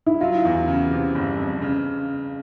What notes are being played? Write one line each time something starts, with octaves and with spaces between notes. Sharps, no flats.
E4
F#3 F4
E2
C#3
C3
G1
F2
C#3